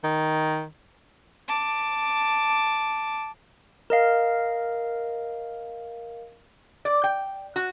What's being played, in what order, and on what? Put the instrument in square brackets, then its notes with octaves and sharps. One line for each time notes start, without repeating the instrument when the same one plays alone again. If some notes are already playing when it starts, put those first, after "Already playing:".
[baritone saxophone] D#3
[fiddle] A5 D6
[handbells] A#4 D#5 F5
[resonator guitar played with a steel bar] D5
G5
F#4